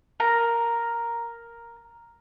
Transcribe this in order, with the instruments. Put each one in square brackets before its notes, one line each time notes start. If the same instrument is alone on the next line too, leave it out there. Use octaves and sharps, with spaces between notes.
[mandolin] A#4 A#5